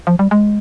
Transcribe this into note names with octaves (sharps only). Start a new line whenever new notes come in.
F3
G3
G#3